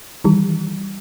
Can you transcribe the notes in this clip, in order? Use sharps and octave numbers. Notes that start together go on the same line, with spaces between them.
D#3 E3 G3